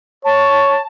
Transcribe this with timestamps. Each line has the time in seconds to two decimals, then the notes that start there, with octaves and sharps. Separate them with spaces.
0.25 C#5 A5